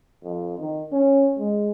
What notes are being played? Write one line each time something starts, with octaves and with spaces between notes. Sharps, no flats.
F2
D#3
C#4
G#3